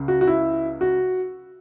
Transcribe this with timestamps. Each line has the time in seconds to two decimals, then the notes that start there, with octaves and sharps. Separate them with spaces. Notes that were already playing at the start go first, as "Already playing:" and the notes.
Already playing: C#2 C#3
0.08 F#4
0.21 F#4
0.27 E4
0.81 F#4